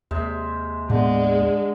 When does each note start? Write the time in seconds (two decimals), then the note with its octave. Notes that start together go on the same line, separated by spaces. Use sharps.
0.11 D#2 C3 G#3 E5
0.90 A2 D3 G#3 B3